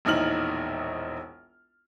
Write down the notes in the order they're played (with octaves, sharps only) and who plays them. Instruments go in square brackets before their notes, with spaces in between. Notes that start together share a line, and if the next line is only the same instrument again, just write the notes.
[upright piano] E1 A#1 D#4 E4 F6 F#7